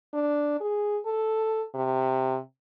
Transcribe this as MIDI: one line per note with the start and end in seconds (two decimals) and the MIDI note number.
0.13 0.57 62
0.60 0.97 68
1.06 1.64 69
1.74 2.38 48